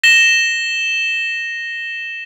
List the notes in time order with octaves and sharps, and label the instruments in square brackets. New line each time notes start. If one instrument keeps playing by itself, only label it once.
[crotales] A#6 E7 G7